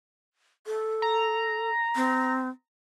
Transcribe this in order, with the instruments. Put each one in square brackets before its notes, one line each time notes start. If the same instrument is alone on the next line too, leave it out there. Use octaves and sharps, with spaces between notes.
[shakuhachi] A4
[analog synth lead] A#5
[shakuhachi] C4